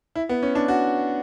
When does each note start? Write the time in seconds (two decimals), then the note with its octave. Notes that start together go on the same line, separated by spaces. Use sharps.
0.16 E4
0.29 B3
0.43 C#4
0.55 D4
0.68 F#4